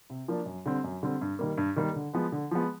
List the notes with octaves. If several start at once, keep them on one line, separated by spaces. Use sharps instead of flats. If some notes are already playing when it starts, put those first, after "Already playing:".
C3
F3 A#3 D4
F#2
D3 G3 C4
F#2
D3 G3 C4
G2
D#3 G3 A#3
G2
D#3 G3 A#3
D3
F3 G#3 B3
D3
F3 G#3 B3